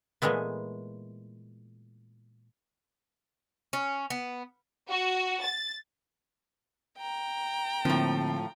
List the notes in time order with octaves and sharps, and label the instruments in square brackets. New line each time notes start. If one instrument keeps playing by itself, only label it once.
[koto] A#2 E3 G#3 A3 B3
[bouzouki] C#4
B3
[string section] F#4
A6
[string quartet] G5 A#5
[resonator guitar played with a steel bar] A2 F3 [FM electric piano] D3 A#3 C4